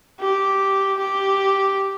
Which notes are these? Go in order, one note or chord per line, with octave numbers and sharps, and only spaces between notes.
G4
G4